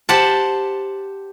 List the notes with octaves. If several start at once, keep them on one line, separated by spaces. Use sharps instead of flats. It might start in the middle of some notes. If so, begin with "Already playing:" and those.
G4 C5 F#5 A5